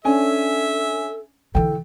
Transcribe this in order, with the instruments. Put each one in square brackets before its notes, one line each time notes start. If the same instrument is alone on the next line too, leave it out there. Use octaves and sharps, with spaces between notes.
[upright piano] C#4 D4 G#5 [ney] A4 [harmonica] E5
[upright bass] D3 E3 [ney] A4 [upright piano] G5